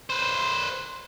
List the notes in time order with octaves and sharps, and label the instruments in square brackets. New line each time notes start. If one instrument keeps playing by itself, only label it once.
[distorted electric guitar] B4 C5